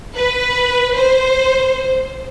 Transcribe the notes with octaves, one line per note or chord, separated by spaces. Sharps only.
B4
C5